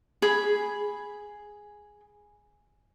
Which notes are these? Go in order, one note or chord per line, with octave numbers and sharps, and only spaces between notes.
G#4 B5